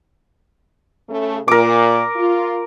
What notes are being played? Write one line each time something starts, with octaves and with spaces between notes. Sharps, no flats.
C#3 A3
A#2 A#4 D6
F4